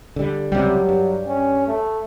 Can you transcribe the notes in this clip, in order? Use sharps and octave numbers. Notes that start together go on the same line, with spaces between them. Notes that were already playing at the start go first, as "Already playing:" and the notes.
D3 G3
C#2 C3 F#3 G3
G2
C#4
A3